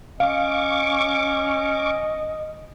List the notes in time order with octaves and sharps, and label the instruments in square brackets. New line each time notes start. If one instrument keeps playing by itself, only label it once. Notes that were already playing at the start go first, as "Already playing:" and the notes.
[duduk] C#4 [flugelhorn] D#5 [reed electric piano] F5 [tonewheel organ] C#6 D6